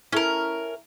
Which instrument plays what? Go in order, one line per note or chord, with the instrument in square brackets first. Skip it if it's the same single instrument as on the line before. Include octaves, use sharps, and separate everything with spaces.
[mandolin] C#4 A#4 [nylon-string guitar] E4 A4